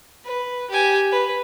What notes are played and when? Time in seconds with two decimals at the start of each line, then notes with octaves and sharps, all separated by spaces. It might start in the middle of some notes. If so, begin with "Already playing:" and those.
0.25 B4
0.70 G4 G#5
1.11 B4